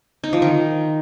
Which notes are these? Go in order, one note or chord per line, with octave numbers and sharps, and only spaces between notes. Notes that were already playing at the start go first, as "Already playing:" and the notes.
D#4
F3
D#3